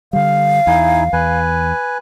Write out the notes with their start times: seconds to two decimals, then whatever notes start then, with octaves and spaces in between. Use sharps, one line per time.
0.13 D3 G3 F5
0.67 E2 D#4 E4 G#5
1.13 E2 B4 G#5